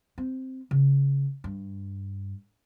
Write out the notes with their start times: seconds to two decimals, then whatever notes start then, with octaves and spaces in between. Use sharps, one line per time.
0.18 C4
0.71 C#3
1.44 G2